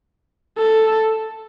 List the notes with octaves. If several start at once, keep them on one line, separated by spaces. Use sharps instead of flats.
A4